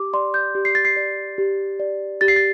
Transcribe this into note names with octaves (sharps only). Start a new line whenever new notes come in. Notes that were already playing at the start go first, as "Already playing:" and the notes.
Already playing: G4 D6
D5 C6
G6
G4
C7
A6
C7
D5
G4
D5
G4 A6
C7
A6